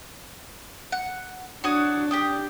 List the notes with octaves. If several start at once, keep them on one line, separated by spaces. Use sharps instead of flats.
F#5
D4 F#4 C#5 D#6
G4 G5 D#6